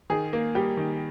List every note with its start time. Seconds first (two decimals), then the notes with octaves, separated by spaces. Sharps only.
0.10 D#3 G#4
0.33 A#3
0.55 G3 G4
0.77 D#3